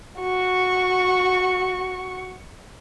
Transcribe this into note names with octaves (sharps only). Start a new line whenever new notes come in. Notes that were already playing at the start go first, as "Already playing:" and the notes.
F#4 C#6